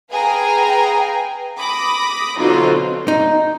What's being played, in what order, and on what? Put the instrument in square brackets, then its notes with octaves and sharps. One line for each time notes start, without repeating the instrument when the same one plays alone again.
[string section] G#4 B4 F5 G5 G#5 A#5
B5 D6 D#6 A#6
B2 D3 F#3 C4 D#4 F4
[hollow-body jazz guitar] D#4